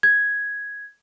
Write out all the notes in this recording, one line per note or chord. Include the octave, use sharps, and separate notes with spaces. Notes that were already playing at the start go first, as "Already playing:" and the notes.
G#6